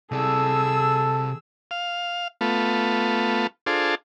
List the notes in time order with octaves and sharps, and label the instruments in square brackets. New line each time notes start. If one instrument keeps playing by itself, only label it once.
[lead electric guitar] C3 D5 [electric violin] G#4 E6 [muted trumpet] A4
[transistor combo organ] F5
A3 B3 F4
D4 F4 G#4 A4 C5